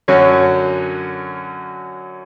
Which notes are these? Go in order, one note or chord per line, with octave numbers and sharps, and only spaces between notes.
F#2 D3 F#3 C#4 F#4